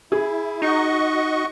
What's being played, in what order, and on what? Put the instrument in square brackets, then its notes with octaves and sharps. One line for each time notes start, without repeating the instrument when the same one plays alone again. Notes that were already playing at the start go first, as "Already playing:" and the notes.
[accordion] E4 [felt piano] G#4
[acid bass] D#4 [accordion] F#4 D#5 C#6